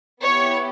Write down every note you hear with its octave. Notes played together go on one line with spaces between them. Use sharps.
B3 E4 G4 C#5